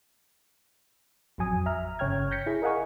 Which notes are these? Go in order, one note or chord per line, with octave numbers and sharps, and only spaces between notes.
A1 F2 F#3 G#5 D#6
E5 A#5 F6
G1 C#3 C#5 G5 F6 G#6
G6 A#6 B6 C#7
E4 G#4
A#4 D#5 F5 F#5 G#5 C#6